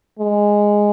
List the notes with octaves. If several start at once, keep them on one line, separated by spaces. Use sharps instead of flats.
G#3